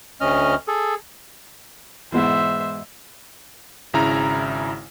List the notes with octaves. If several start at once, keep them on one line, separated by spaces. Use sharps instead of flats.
D2 C#4 D#5 F6
G#4 A4
G#2 B2 E3 C5 E5
G#1 C#3 E4 A#5